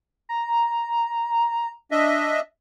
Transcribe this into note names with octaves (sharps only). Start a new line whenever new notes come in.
A#5
D4 D#5 E5